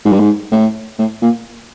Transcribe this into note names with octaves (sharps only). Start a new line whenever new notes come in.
G#2
G2
G#2
A2
A2
A#2